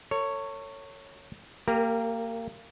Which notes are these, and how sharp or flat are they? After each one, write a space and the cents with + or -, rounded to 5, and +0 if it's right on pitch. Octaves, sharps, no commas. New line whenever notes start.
A4 +45 C#5 +0
A#3 -30 G4 +0 A#4 +0